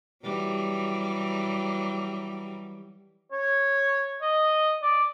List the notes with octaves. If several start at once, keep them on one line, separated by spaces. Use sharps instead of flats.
E3 F#3 G3
C#5
D#5
D5